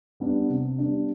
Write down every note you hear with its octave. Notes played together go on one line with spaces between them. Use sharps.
G3 B3 D4
C3
G3 B3 D4